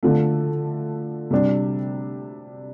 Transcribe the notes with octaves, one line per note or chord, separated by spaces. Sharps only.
D3 F3 A3
C3 G3 D4